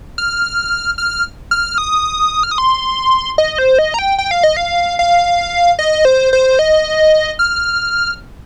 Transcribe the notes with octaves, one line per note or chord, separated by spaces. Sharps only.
F6
F6
F6
D#6
F6
D#6
C6
D#5
C5
D#5
A#5
G5
G5
F5
D#5
F5
F5
D#5
C5
C5
D#5
F6